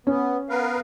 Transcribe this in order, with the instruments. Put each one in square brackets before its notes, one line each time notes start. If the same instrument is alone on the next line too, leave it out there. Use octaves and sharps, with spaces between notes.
[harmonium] B3 [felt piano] C#4
[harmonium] B3 [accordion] A#4 B4 F5